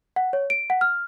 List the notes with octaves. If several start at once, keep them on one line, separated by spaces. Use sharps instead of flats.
F#5
C#5
D7
F#5
F6